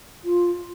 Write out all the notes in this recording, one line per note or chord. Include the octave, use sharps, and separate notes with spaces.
F4